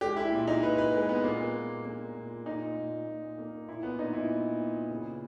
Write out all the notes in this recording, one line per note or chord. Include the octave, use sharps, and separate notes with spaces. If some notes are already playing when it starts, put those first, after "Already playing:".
G#3 G4
E4
A#2
D#4
A#2 B4
B4
G#3
B3
A#2 A#3
A#2
A#3
A#2
A#2 D#4
A#2
A#2
A#3
A#2 E4
B3
A#2 D#4
E4
A#2
A#2
C#3